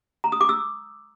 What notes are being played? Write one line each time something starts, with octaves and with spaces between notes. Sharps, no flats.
A#5
D#6
D6
E6